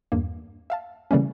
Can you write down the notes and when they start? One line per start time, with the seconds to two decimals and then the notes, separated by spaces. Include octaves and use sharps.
0.12 E2 G2 A#3
0.70 E5 F5 A5
1.11 C#3 E3 G3 A3 A#3 C#4